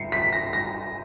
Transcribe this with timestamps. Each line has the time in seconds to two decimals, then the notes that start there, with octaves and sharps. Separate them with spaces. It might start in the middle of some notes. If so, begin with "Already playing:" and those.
Already playing: C7 C#7
0.12 B6
0.33 A#6
0.53 A#6